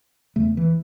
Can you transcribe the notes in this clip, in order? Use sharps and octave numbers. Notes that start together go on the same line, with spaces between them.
E2 C#3 A3
E3